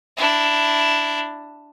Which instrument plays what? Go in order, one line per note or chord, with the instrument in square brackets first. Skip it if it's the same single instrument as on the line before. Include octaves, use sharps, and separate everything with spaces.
[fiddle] D4 E4